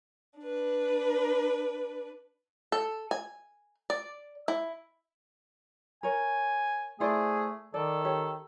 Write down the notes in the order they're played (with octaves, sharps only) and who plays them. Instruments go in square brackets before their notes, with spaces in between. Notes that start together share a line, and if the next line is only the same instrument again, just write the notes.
[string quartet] D4 B4
[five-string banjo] A4
G#5
D5
E4
[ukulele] A#4 C#5 [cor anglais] G#5
[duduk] A3 [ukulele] E4 C5 D5 [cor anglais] G#4
[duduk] D#3 [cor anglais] A4 [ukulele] D5
[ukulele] G4 C#5